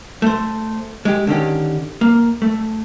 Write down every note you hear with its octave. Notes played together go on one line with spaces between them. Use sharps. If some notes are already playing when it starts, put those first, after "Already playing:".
A3 C5
G#3 G4
D3 D#3 C#4 G4
A#3
A3